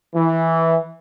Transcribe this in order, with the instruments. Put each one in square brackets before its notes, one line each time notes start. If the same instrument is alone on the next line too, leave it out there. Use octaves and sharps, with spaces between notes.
[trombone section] E3